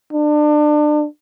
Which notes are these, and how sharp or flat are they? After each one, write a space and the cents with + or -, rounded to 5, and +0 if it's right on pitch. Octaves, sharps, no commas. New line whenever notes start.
D4 +30